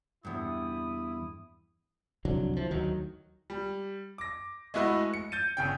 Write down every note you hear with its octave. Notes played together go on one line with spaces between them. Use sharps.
E2 G2 E4 D#6
C2 F2 D3 F#3
E3 F3
D2 D#3 F#3
G3
D6 A#6
G#3 A3 E4 F#4 B4 D#5
C#7
G6 A6 D#7
G1 C#3 G5